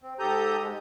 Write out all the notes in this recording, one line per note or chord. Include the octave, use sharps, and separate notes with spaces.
C4
G#2 G4 A4 A#5 D#6 G6
G#3